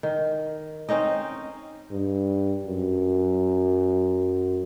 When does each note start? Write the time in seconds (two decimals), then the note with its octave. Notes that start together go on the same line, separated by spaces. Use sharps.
0.03 D#3
0.89 C4 C#4 D#4 D#5
1.91 G2
2.66 F#2